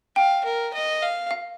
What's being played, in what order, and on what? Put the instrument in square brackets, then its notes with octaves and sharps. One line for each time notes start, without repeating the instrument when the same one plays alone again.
[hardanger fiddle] F5 [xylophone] G5
[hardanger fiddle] A#4
D#5
F5
[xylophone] F5